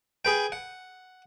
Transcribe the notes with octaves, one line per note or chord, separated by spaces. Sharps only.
G#4 B4 G5
F#5